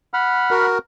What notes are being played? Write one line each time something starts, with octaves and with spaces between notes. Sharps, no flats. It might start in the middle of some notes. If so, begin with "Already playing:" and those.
F#5 B5 F6
F#4 A#4